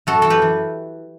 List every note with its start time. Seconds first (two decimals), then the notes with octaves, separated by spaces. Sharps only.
0.07 F#2 F#4 A4
0.22 E3 A4
0.30 G4 B4
0.42 E3